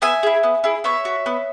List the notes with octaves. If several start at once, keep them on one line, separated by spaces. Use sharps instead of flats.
B3 E5 G#5
E4 G#4
B3
E4 G#4
B3 C#5 E5
F#4
B3